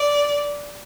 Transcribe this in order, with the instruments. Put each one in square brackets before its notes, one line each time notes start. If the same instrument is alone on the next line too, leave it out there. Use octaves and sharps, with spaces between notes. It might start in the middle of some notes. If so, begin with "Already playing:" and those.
Already playing: [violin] D5